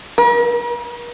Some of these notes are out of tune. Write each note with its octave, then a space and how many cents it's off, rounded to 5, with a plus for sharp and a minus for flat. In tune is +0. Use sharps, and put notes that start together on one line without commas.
A#4 +45